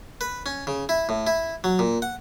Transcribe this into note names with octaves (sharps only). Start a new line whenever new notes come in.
B4
C#4
C#3
E4
A2
E4
F#3
A#2
F#5